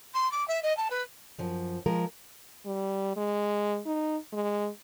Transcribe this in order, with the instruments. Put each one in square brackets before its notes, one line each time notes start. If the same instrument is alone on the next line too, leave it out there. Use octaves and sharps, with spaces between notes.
[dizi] C6
D6
E5
D#5
A5
B4
[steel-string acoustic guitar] F#2 F3
F3 G#3 A#4
[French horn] G3
G#3
D#4
G#3